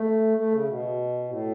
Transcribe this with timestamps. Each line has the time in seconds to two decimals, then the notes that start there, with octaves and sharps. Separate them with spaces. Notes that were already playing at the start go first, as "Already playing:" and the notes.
Already playing: A3
0.37 A3
0.52 C#3
0.67 B2
1.28 A2